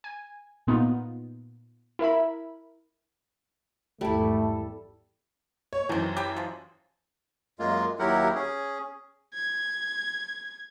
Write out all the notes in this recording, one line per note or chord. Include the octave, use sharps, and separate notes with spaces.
G#5
A#2 B3 D#4 F4
E4 A#4 E5 B5
G#1 E2 G3 A3 E4 A4
C#5
F#2 C3 D#3 E3
G4 B5
F3 G#3
F#2 G#3 A#3 F4
D#2 F#3 E4 G4 A#4 F#5
C#4 G#4
G#6